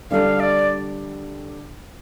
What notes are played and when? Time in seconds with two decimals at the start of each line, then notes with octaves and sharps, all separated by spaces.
0.11 D3 G3 D4 A4 F5
0.40 D5